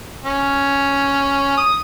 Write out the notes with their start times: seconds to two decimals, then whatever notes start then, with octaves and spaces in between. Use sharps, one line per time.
0.24 C#4
1.57 D#6